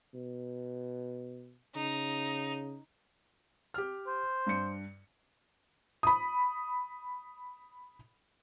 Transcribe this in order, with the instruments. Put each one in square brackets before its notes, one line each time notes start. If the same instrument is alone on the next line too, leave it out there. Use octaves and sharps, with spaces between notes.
[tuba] B2
[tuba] C#3 [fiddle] D#4
[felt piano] G4 F6
[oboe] C5
[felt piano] G2 C#7
B5 D#6